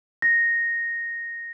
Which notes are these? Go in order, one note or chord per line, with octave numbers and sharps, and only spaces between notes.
A#6